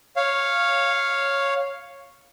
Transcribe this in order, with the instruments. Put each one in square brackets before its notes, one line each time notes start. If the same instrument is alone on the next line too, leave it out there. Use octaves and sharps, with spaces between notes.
[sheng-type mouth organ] C#5 F5